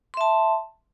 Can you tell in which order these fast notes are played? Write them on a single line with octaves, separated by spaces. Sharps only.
C6 E5 A5